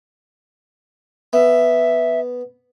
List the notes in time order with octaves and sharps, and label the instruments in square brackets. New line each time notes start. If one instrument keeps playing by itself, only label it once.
[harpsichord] B3 [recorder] E5